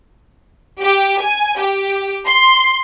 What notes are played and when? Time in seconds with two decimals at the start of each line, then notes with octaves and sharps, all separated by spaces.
0.80 G4
1.20 G#5
1.58 G4
2.26 C6